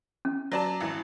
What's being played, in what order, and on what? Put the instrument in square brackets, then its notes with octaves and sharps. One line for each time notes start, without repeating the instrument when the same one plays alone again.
[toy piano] C#4
[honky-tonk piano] F#3 D5 A5
G#1 E3